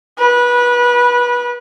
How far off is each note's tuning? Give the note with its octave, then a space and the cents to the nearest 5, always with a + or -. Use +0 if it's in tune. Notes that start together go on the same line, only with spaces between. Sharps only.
B4 -25